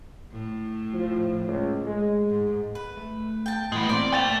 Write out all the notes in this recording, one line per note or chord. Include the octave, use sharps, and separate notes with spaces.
A2
F3
C#2
G#3
G#2
B4
A3
G5 A5
A2 E3 G#3 B3
A#3 C4 E4 A#4 C5 D5
A3 A#3 G5 A6 F7